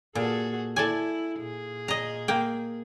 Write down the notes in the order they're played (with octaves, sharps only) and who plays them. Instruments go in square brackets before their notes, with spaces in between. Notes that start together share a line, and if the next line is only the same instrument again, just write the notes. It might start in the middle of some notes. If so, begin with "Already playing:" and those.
[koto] A#2 [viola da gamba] F#4 G#4 A4
[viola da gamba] E4 [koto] A4 D5 G#5
[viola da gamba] A#2 G#4
[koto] D#5 A#5
A#3 G5